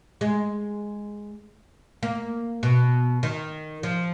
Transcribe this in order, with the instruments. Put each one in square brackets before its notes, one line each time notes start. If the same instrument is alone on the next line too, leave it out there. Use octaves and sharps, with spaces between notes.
[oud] G#3
A#3
B2
D#3
F3